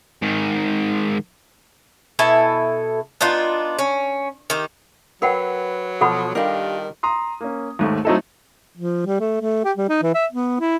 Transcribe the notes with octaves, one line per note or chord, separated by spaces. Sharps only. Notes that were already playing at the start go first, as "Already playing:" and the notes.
G#2 D#3
B2 E4 A4 G#5
B3 D4 D#4 F4
C#4
D#3 G4
F#3 A#4 B4 C#5 F#5 G5
B2 F3 A4 F#5 B5
D#3 G3 D4 F4 G4 A#4 A#5
A#5 C6 D#6
A#3 C#4
D#2 G#2 A3
F#3 A3 C4 D#4 E4 A4
F3
G3
A3
A3
G4
G3
D#4
E3
E5
B3
E4